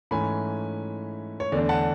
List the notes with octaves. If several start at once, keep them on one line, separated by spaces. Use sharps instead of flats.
G#2 E3 A3 C#4 G#5 B5
C#5
E2 D3 A3 D4 D5
F#5 A5